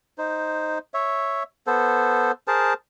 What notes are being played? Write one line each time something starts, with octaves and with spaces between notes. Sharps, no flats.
D#4 C5
C#5 E5
B3 A4 C5
G#4 A#4 C5 A5